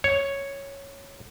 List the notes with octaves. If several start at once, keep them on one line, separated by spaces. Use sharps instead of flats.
C#5